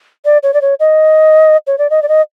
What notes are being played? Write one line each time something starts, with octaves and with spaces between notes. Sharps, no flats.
D5
C#5
D5
C#5
D#5
C#5
D5
D#5
D5
D#5